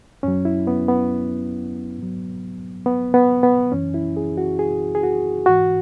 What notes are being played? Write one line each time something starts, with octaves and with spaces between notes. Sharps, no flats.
F#2 F#3 C#4
E4
B3
B3
G#2 F#3
B3
B3
B3
F#2 E3 C#4
E4
G#4
F#4
G#4
G#4
F#4
G#2 E3 F#4